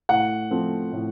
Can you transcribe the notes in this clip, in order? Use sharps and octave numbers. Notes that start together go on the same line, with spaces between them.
A2 F#5
F3 A3 C4
A2